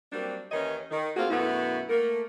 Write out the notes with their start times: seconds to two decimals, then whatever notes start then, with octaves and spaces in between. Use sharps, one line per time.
0.12 F#3 G3 A#3 C4 D4
0.52 D#2 D#3 E3 C#4 C#5 D#5
0.91 D#3
1.17 A3 A#3 C4 F4 F#4 G#4
1.30 F#2 B2 A3 B3 E4
1.89 A3 A#3 A#4